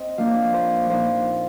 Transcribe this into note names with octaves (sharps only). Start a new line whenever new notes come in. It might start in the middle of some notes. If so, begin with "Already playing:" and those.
Already playing: C4 D#5
F3 A#3 D4 F5
C5
A#2 F3 C4 D#4 C5